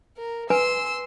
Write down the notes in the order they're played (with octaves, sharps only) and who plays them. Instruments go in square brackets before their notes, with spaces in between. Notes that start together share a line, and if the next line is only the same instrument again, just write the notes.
[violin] A#4
[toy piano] B4 G#5 [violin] C6 E6